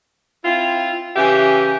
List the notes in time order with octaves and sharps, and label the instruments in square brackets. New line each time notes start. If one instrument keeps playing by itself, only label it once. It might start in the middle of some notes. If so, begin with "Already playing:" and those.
[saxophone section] C4 E4 F4
C#3 E3 G4 E5